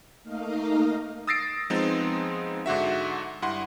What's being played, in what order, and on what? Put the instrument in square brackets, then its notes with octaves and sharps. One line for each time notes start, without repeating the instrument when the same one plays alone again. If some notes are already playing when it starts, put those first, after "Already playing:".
[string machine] A3 A#3 D#4 A#4 D#5 F5
[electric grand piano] D#6 E6 A6 A#6 C7 D7
F3 G#3 B3 C4 D#4
G#2 D3 F#4 E5
G2 E4 F#5 C6